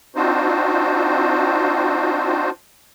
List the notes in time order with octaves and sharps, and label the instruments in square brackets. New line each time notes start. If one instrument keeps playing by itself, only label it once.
[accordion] C4 D4 D#4 F4 F#4 C5